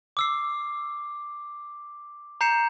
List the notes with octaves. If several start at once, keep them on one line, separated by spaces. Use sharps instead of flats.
D6 E6 C7
A#5 G6 C7 C#7 E7